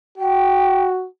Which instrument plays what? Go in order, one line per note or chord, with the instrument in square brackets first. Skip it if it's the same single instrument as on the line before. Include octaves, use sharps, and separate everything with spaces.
[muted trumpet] F#4 [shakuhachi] G5